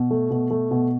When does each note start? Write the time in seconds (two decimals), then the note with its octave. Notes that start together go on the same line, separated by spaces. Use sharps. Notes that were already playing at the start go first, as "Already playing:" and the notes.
Already playing: B2
0.11 A3
0.30 B2
0.50 A3
0.71 B2